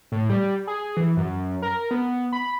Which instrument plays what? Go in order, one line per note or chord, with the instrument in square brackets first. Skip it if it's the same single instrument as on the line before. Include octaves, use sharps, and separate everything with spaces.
[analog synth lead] A2
G3
G#4
E3
F#2
A#4
B3
B5